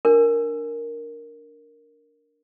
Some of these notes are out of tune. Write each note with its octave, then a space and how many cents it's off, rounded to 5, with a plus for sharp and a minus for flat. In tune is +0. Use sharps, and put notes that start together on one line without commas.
D4 +0 A#4 +0